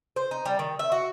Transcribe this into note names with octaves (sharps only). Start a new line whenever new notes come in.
C5
D#4
G3
D#3
E5
F#4